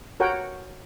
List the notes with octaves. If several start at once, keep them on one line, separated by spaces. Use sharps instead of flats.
F#4 A#4 C#5 F#5 G5